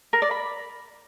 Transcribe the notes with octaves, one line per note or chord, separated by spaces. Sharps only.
A#4
D5
B5